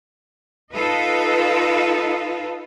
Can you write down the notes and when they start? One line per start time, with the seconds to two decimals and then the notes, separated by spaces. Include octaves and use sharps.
0.72 D#4 F4 A4 B4 D#5